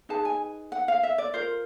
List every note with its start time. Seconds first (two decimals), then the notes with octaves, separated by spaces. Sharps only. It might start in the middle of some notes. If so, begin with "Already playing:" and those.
0.09 D#4 G#4 B4 A5
0.25 G#5
0.72 F#5
0.88 F5
1.03 E5
1.18 D5
1.34 F4 A#4 C5